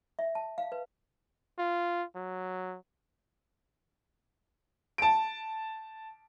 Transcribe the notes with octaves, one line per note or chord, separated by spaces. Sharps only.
E5
A5
F5
B4
F4
F#3
A5 D7